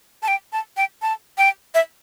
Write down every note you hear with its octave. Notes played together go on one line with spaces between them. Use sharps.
A5
G5
A5
G5
A5
G5
E5